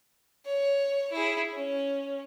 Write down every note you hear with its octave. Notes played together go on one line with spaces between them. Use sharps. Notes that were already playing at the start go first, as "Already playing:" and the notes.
C#5
E4 G#4
C#4